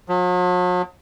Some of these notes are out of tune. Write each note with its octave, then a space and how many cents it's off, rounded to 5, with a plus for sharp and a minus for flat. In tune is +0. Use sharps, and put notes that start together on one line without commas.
F#3 -45